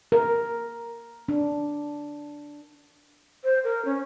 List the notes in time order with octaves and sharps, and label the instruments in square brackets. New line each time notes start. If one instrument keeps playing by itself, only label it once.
[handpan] A#4
D4
[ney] C5
A#4
C#4